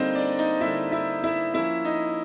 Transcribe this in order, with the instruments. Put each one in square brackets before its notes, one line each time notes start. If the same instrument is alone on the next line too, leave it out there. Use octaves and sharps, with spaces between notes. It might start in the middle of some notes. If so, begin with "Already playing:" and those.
Already playing: [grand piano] D3 G3 A#3 C4 D#4 C5 D#5
D4 D5
D#4 D#5
D3 G3 A#3 D#4 E4 E5
E4 E5
E4 E5
F3 A#3 C#4 E4 E5
D#4 D#5